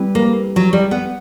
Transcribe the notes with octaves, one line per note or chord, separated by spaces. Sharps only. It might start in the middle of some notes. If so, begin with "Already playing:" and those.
Already playing: G3 C4 E4 G4 B4
A#3
F#3
G3
B3